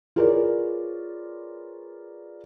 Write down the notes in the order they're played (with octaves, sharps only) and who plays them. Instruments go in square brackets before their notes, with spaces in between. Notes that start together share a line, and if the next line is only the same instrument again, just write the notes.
[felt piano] F4 G#4 A#4 B4 C#5 D5